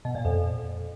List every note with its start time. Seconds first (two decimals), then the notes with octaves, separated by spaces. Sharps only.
0.05 B2
0.15 A#2
0.25 F2